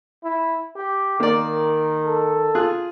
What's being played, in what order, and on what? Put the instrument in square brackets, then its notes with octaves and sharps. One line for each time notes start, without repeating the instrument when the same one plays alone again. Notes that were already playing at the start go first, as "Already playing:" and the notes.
[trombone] E4
G4
[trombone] D#3 [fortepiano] A#3 D5
[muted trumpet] A4
[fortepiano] F4 G#4 F#6